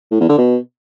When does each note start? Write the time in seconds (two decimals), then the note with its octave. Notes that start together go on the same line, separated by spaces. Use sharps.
0.11 A2
0.20 E2
0.29 D3
0.38 B2